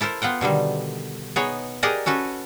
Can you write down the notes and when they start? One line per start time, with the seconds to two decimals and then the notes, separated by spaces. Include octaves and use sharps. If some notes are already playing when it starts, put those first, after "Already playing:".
0.01 E4 A4 A#4 C5
0.22 B3 F4 F#5 G5
0.41 B2 D3 D#3 G3
1.36 B3 D#4 G#4 C#5
1.83 G4 G#4 A#4 D5 D#5 F#5
2.06 C#4 F#4 A4 B4